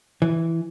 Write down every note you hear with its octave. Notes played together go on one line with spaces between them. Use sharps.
E3